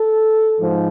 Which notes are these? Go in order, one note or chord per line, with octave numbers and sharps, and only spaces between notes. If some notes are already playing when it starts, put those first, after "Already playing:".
Already playing: A4
G#2 F3